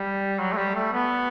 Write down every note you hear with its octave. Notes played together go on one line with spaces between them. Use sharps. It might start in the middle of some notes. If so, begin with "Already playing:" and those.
Already playing: G3
F#3
A3
G3
A3
B3